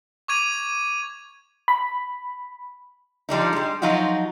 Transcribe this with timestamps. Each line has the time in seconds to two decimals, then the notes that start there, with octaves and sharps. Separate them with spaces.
0.28 C#6 D6 G#6 D#7 F7
1.68 B5
3.29 F3 G3 D4 D#4
3.53 G3 G#3
3.82 F3 F#3 D#4 F4 F#4